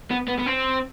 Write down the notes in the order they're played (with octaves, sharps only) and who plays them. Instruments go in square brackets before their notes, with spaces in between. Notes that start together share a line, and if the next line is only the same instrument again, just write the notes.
[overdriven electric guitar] B3
B3
B3
C4